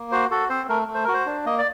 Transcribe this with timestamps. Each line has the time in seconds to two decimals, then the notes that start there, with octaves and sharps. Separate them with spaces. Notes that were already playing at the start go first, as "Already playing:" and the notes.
Already playing: A#3
0.11 F#4 C5
0.31 F#4 A4
0.49 C4 C5
0.69 A3 A#4
0.88 A3
0.95 C5
1.04 F#4 A#4
1.14 C5
1.26 D4
1.46 A#3 D#5
1.58 D5